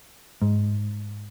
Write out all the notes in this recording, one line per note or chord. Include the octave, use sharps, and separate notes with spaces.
G#2